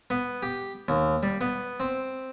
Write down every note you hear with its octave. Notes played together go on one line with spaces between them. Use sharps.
B3
G4
D#2
G3
B3
C4